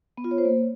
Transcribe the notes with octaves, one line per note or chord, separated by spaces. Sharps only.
B3
F4
C#5
C5
A#3